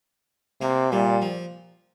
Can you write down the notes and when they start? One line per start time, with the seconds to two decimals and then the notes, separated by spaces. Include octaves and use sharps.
0.61 C3 A#3
0.92 A#2 G3
1.22 F3